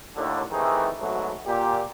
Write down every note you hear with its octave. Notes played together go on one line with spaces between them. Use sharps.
D#2 A2 D3
C3 D#3 E3 A3 D#4 G#4
G#2 B2 F#3 A3
A#2 G4